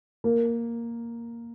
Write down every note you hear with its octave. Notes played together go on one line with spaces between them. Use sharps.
A#3 A#4